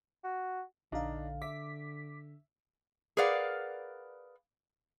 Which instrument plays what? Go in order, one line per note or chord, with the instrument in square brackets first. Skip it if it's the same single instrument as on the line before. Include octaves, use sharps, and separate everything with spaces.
[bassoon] F#4
[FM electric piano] A#1 F5 [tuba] D3 [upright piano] D4 D#4 A#5
[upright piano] E5 [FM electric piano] D6 B6
[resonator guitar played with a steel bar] G#4 A#4 B4 D5 F5 F#5